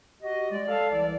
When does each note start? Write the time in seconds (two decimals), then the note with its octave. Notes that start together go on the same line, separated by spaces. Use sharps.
0.21 F#4 G4 D#5
0.50 G#3 D5
0.67 A4 D5 F5
0.91 C2 E3 G#3 D5